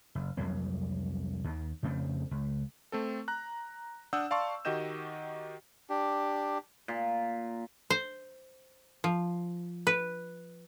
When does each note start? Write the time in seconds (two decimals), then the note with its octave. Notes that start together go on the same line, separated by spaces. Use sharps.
0.15 F#1
0.37 C2 F2 F#3 A#3
1.44 D#2 D#3
1.83 F2 C#3 A3 C4
2.31 C#2
2.92 A3 C4 A4
3.28 A#5 F#6
4.13 D4 F#5 D#6 E6 G6
4.31 D5 F5 A5 C6 C#6
4.65 D#3 F#4 G4 D#5 G6 E7
5.90 D4 G4
6.88 A#2
7.90 C5
9.04 F3
9.87 B4